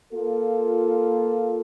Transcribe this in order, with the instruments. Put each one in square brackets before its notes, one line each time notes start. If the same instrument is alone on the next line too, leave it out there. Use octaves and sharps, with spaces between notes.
[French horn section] A#3 F4 A4